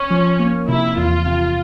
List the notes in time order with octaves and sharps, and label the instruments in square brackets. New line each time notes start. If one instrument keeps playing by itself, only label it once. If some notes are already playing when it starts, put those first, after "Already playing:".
Already playing: [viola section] C#4
[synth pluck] F3
A#3
[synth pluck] C3 [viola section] E4
[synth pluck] E2 [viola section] F4
[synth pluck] C3